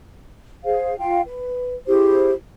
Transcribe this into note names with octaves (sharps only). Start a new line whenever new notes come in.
G#4 C5 F5
F4 F5 G5
B4
E4 G4 G#4 C5